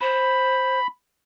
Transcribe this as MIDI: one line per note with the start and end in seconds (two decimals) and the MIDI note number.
0.01 0.79 72
0.01 0.87 83